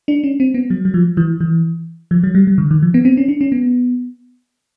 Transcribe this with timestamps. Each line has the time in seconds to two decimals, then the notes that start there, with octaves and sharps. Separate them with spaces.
0.08 D4
0.24 C#4
0.40 C4
0.54 B3
0.70 F#3
0.85 F#3
0.94 F3
1.17 E3
1.41 E3
2.11 F3
2.23 F#3
2.35 G3
2.47 G3
2.58 D3
2.71 D#3
2.82 F3
2.94 B3
3.05 C4
3.17 C#4
3.28 D4
3.41 C#4
3.52 B3